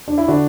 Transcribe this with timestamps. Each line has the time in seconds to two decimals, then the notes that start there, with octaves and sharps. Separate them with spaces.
0.08 D4
0.18 E4
0.28 D3 D4 F#4